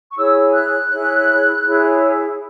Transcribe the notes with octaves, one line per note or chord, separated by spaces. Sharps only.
C#6
E4 G#4 C#5 E6
F#6
E4 G#4 C#5
E4 G#4 C#5